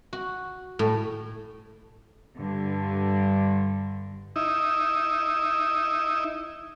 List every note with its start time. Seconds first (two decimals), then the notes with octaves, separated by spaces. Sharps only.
0.13 F#4
0.79 A2
2.36 G2 D3
4.36 D#4 E4